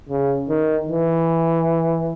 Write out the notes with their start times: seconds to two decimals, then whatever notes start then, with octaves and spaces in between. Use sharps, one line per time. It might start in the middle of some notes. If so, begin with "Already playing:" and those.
0.09 C#3
0.49 D#3
0.89 E3